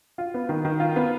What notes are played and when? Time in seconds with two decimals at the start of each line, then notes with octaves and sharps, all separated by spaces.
0.18 F4
0.34 B3
0.49 D#3
0.65 D#3
0.80 F4
0.96 B3